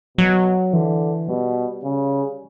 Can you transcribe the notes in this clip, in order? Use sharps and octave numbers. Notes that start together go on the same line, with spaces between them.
B2 F#3
D3 E3
B2 G3
C#3